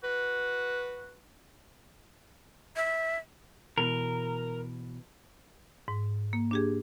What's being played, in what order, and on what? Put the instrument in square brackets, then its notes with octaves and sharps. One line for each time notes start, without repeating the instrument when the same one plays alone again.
[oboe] F#4 [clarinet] B4
[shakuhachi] E5
[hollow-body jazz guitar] B2 E3 [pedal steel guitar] A#4
[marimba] G#2
A#3
D4 G4 G#4